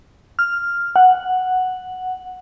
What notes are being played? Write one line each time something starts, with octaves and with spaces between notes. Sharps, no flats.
F6
F#5